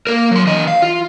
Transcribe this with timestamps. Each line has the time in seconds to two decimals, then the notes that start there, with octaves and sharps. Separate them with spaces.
0.07 A#3 A#4
0.31 F#3 C6
0.47 E3 D#5
0.67 F5
0.82 F4